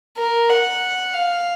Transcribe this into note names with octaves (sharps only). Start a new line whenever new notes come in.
A#4
F#5
F5